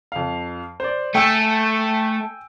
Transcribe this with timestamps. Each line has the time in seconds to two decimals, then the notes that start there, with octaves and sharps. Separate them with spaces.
0.12 F2 F5
0.80 C5 D5
1.15 A3 G5 G#5 E6